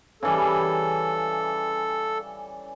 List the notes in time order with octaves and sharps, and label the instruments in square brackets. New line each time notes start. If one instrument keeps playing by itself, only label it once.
[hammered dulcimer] C#3 E3 G3 [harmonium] A4